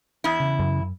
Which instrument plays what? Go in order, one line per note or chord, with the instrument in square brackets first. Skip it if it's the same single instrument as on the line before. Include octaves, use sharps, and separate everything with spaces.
[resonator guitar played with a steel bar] E2 E4
[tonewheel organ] C#3
[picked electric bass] F#2